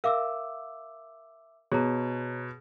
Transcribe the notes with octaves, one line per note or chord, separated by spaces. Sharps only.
A#4 E5 F5 D6 E6
B2 G#4 C#5 A#5